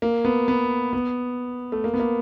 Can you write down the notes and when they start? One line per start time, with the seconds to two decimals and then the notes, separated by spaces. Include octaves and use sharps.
0.02 A#3
0.25 B3
0.48 B3
0.93 B3
1.72 A3
1.84 A#3
1.94 B3
2.00 A#3